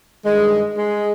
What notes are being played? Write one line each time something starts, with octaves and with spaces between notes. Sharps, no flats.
G2 D#3 G#3
G#3